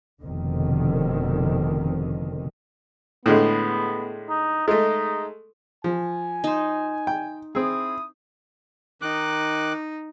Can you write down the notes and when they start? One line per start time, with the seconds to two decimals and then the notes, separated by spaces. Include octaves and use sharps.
0.21 F1 B2 D3 D#3 C4
3.26 A2 D3 G#3 B3
4.29 D#4
4.68 G#3 A3 D#4
5.84 F3 G#5
6.44 D#4 C5
7.07 G5
7.55 C4 E4 G#4 D#6
9.02 D#3 D#4 D6 F#6